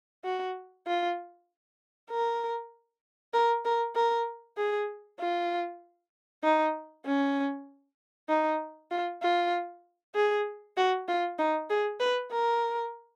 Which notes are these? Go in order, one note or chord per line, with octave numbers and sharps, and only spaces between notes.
F#4
F4
A#4
A#4
A#4
A#4
G#4
F4
D#4
C#4
D#4
F4
F4
G#4
F#4
F4
D#4
G#4
B4
A#4